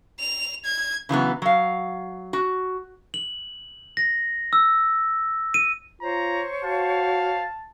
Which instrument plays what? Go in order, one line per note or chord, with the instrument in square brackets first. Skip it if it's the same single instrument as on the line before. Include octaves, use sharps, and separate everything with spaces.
[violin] F7
G#6
[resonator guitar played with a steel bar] C#3 E3 F#3 B3
F#3 F5
F#4
[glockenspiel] F#7
A#6
E6
D#7
[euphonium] F4 [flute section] C5 C#5 [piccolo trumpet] A#5
[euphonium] F#4 [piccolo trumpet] F5 [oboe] A5